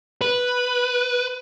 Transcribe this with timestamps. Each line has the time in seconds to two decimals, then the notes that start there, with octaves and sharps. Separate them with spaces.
0.21 B4